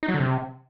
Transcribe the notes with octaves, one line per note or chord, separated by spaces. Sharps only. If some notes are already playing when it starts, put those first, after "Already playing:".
D#4
F#3
D3
C3